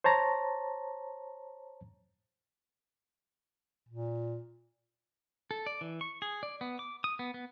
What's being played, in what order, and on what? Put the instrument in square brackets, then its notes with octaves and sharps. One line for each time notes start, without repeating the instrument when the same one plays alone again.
[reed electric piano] C5 C#5 A5 A#5
[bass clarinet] A#2
[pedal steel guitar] A4
D5
E3
C#6
G#4
D5
B3
D6
D#6
B3
B3